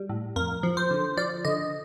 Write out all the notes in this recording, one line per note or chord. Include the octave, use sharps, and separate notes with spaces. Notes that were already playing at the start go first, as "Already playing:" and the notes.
Already playing: G3
A2
F2 A#4
F3
C5
D3
F3 D5
D3 D#5